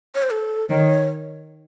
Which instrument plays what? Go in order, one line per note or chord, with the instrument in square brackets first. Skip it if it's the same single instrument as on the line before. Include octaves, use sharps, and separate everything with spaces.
[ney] C#5
C5
A4
[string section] D#3 [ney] C#5